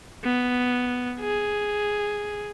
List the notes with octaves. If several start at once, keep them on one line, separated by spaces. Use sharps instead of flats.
B3
G#4